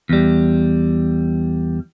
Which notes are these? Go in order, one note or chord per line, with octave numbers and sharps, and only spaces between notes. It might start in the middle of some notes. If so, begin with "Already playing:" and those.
E2 G3